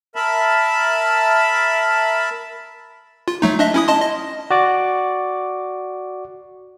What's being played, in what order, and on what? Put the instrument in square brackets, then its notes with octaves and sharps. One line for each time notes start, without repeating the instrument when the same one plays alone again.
[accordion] A#4 E5 A5 B5
[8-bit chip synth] F4
F#3 A3 D#4
D4 D#5 E5
C#4 E4 D#6
D#5 A5 C6
D#5
[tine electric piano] F#4 D5 D6